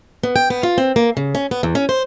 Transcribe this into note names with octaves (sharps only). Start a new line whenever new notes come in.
B3
G5
B3
F4
C4
A#3
C#3
C#4
B3
E2
C#4
C5